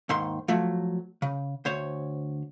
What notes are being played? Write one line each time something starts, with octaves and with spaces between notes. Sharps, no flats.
D#2 G#2 D#3 C6
F3 F#3 A3
C#3
D2 C5 C#5